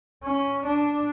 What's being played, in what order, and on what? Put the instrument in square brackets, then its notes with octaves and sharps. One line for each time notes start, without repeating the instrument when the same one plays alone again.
[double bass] C#4
D4